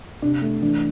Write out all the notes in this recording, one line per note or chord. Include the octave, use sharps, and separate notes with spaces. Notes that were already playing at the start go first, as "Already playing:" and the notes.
C3 D4
A3
E3 D4